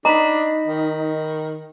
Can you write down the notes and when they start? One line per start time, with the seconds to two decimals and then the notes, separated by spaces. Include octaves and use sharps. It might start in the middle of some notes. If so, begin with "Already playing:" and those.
0.05 D4 D#4 D#5 A#5 B5 B6
0.67 D#3